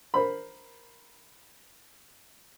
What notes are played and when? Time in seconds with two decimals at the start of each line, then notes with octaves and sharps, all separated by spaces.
0.14 A#4 C5 B5